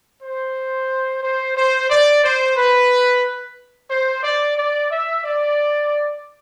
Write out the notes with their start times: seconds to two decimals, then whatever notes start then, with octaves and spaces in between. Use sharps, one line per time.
0.23 C5
1.23 C5
1.56 C5
1.90 D5
2.23 C5
2.56 B4
3.90 C5
4.23 D5
4.57 D5
4.90 E5
5.23 D5